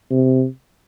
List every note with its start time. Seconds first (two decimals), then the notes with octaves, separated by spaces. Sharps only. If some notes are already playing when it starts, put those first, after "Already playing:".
0.10 C3